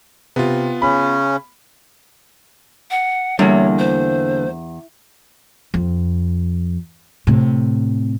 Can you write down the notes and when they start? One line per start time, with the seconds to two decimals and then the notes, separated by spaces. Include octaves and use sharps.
0.36 C3 B3 F4
0.82 C#3 C#4 B5
2.91 F#5
3.39 E2 D3 G3 A#3 C#5
3.79 C5
5.74 F2
7.27 A2 C3